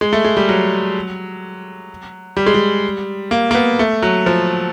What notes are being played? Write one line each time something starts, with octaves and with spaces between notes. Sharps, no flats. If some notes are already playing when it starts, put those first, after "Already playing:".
G#3
A3
G#3
G3
F#3
G3
G#3
G3
A#3
A#3
B3
A3
F#3
F3